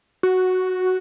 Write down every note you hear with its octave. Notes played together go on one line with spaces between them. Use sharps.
F#4